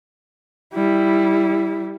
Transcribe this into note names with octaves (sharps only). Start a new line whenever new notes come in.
G3 E4